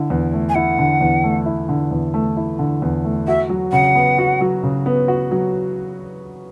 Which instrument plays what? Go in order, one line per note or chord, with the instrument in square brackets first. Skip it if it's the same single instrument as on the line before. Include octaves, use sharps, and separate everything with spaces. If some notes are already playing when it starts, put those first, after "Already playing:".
Already playing: [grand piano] D3 E4
E2
A3
[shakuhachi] G#5
[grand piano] E4 [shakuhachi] F#5
[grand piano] D3
E2
A3
E4
D3
E2
A3
E4
D3
E2
A3
[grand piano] F#4 [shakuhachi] E5
[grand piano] F#3
[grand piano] C#3 [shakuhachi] F#5
[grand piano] B3
F#4
F#3
C#3
B3
F#4
F#3